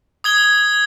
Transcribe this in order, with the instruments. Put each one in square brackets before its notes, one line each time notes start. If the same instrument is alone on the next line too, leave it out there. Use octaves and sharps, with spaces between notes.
[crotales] D#6 G#6 G7